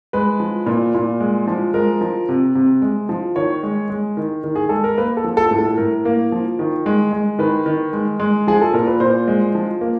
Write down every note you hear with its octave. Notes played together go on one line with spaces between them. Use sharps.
G#3 B4
F3
A#2
A#2
G#3
F3
G#3 A#4
F3
C3
C3
G#3
F3
D#3 C#5
G#3
G#3
D#3
D#3
G#4
G#3 A4
A#4
A#3 B4
A4
F3
A4
A2
A4
A2 A#4
A#3
F3
D#3
G#3
G#3
D#3 B4
D#3
G#3
G#3
F3 G#4
A4
A#2 A#4
B4
A#2 C5
G#3
F3
A#3